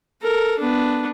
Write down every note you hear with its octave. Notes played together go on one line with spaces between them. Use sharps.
A4 A#4
B3 D4